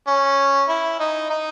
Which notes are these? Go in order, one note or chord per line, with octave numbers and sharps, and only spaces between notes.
C#4
E4
D#4
D#4